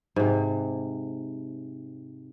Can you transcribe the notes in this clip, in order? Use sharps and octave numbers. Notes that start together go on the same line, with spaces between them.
G#2 C3